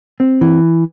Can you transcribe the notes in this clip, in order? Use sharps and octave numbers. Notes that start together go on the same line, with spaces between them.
C4
E3